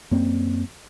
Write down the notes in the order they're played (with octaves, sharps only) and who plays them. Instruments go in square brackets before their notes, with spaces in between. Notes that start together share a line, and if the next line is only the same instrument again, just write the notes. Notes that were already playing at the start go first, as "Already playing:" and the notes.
[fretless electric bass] F#2 A#3 C4